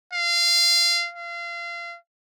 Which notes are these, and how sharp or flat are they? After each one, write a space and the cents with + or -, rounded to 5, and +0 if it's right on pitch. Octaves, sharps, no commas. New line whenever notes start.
F5 -20
F5 -30